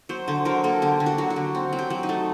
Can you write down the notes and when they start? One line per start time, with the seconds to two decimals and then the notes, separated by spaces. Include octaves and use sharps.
0.09 F#3 C5
0.28 D3 C5
0.45 F#3 A#4
0.64 A#3 A4
0.82 D3 G4
1.00 D3
1.06 F#4
1.18 F#3
1.30 F#4
1.36 D3
1.55 C4
1.73 F#3
1.79 G4
1.90 F#3
2.03 D#4
2.09 A3